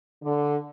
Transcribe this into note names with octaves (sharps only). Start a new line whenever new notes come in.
D3